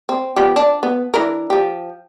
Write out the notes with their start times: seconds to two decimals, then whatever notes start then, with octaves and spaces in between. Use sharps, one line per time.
0.09 C4
0.36 F3 B3 G4
0.56 D4
0.83 B3
1.14 E3 D4 A#4
1.50 F3 G4